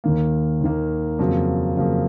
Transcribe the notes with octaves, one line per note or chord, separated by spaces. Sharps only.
D#2 D#3 A#3
D#2 D#3 A#3
F2 C#3 F#3 A#3
F2 C#3 F#3 A#3